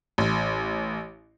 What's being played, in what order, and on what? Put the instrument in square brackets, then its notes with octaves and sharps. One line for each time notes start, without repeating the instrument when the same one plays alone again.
[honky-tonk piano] A1